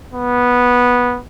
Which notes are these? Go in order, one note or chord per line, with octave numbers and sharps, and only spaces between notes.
B3